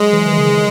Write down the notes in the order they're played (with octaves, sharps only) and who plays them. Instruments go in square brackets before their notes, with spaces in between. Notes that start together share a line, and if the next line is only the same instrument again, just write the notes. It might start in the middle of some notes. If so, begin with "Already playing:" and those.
Already playing: [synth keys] F#3 [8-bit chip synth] G#3
[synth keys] E3
D#3
C#3
D#3